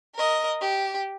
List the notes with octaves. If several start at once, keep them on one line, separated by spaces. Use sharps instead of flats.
A#4 D#5
G4